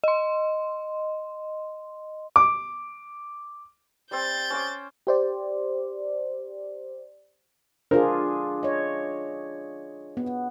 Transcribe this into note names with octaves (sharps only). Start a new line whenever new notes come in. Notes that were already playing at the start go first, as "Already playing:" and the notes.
D#5 C6
D6
G3 C4 G6 A6
C#4 C5 D6
G4 C5 D5
D4 F4 G#4 A#4 C5
C#5 D#5
B3